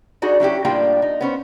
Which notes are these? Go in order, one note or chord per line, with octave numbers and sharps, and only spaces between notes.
D4 D#4 F#4 G#4
F#3 C#4 E4 G4
A2 G3 A#3 D4 F4 G5
D#4
B3 C#4 C5